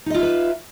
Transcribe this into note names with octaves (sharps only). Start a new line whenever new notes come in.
D#4 F4 B4 D#5 E5